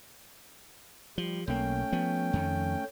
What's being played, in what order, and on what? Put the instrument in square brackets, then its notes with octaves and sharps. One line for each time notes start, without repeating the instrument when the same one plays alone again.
[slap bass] F3 [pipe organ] G3
[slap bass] B1 A#3 [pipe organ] A3 C#4 G5
[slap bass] F3 B3
F2 D#3